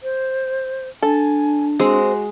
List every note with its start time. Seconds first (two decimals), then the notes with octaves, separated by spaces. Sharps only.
0.03 C5
1.03 D4 A4 G#5
1.80 G#3 C4 F#4